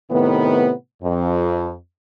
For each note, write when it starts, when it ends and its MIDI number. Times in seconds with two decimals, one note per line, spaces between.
0.11 0.71 45
0.11 0.71 48
0.11 0.71 51
0.11 0.71 59
1.03 1.73 41